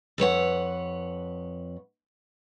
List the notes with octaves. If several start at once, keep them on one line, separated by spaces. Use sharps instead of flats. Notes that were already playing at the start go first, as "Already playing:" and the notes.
F2 B4 C#5 F#5